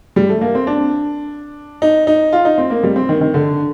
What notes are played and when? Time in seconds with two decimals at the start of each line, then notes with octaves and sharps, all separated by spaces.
0.16 G3
0.29 A3
0.41 A#3
0.55 C4
0.67 D4
1.82 D#4
2.07 D#4
2.33 F4
2.45 D#4
2.58 C4
2.70 A#3
2.83 G3
2.96 C4
3.09 D#3
3.21 D#3
3.34 D3